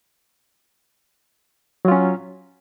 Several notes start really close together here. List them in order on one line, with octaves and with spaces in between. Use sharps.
F#3 F4 C#4